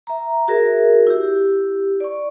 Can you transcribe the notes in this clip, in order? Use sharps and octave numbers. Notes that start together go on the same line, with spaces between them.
E5 A#5
F#4 G#4 A#4 E5
E4 G4
D5 C#6